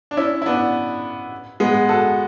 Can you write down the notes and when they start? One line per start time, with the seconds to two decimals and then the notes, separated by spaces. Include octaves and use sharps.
0.11 D4
0.17 C#4 E4
0.42 E4
0.46 B3 D4
1.60 G#3 B3
1.89 F#4 A4